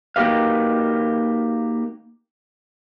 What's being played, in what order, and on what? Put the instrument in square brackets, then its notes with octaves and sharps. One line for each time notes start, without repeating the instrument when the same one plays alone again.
[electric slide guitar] A#3 D#4 F#4 G4 B4 F5